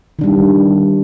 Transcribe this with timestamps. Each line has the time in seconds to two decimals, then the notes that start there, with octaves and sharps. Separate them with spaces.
0.19 D#3
0.21 D4
0.24 G3